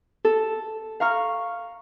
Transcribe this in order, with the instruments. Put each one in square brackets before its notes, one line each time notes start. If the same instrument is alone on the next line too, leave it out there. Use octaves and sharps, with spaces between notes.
[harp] A4
F5 A#5 C#6 F6